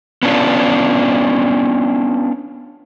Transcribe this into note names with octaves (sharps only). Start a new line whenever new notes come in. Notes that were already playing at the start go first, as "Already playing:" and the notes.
B3 C#4 D4 F4